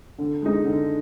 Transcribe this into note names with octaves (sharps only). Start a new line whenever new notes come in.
D3
G#3 D#4
D3